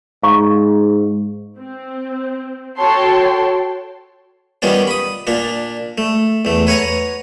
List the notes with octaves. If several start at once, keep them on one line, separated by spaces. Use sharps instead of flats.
G#2 F5 A#5 C#6
C4
F#4 A4 C#5 G5 A5 C6
D#3 G3 B3 C#4 F4
B5 D#6
A#2 D4 F4
A3
E2 A3
B4 C#5 F#5 G#5 A#5